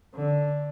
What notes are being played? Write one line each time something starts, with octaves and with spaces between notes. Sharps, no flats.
D3